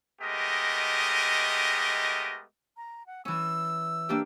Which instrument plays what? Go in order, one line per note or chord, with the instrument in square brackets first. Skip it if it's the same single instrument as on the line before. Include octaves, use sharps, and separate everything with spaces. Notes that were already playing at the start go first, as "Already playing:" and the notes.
[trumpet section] G#3 A3 B3 G4 A#4 D#5
[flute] A#5
F#5
[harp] E3 C#4 [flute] E6
[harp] A#3 D4 G4